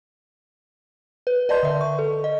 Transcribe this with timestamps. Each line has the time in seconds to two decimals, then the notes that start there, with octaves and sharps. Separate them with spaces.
1.27 B4
1.49 B4 D5 D#5 A5 C6 G6
1.63 D3 E5
1.81 C#6
1.99 A4
2.24 D#5